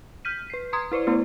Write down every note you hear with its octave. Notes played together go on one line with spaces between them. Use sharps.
F6 G6 B6 D#7
B4 C7
A#5 C6 D#6 G#6
E4 B4 C5 D5
A3 B3 E4